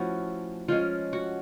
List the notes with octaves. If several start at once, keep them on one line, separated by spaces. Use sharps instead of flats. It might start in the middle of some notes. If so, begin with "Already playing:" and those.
Already playing: F3 A3 C#4 E4 F#4
F3 G#3 C#4 F4
F#4